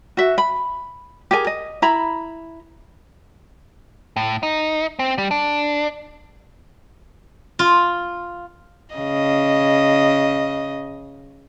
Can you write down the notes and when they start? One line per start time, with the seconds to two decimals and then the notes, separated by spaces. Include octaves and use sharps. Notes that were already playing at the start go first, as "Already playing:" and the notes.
0.17 F#4 E5
0.38 B5
1.31 G4 G#4 A#4 G#5
1.47 D#5
1.82 E4 A#5 B5
4.16 A2
4.43 D#4
4.99 C4
5.18 G3
5.31 D4
7.59 F4
8.94 C#3 D#5